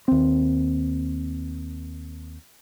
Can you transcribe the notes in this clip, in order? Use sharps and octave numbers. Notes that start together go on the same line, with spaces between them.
D#2 C4